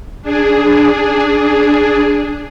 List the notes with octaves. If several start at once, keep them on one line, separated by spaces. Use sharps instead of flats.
D4 G#4